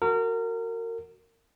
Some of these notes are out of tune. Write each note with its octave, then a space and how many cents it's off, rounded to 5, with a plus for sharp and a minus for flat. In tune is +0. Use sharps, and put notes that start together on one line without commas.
F#4 +0 A#4 -30